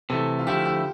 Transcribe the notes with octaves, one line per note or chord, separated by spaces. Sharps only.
C3 E3 A3 A4
F4
D3 F3 A3 E4 G4
G4